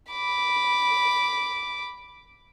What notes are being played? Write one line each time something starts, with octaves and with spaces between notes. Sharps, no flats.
B5 D6